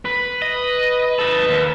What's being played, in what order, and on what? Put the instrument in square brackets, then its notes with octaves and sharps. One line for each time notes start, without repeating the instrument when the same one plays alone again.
[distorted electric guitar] B4
[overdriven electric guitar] D#5
D#4 A4
D#2